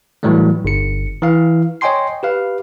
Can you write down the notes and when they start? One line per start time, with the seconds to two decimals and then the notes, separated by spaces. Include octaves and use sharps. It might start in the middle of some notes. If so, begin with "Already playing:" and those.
0.23 A2 E3 F#3 G3 A3
0.64 G1 C#7
1.22 E3 E4 F5
1.81 C#5 D#5 G5 G#5 C6 C7
2.23 G4 B4 F5